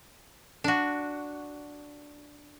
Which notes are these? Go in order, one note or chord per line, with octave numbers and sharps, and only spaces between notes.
D4 F#4